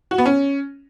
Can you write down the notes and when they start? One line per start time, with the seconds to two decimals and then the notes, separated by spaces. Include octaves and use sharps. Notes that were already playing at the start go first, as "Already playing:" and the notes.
0.11 F#4
0.18 B3
0.26 C#4